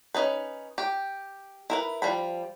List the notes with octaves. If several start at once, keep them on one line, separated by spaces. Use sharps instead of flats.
C#4 D#4 B4
G4
E4 A#4 B4
F3 G3 B5